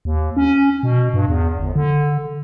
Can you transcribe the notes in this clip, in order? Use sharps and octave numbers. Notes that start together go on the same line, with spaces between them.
D#2
C#4
B2
G2
E2
G1
D3